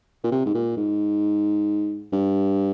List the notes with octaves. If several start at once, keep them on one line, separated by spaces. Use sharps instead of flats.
A#2
C3
G#2
A#2
G#2
G2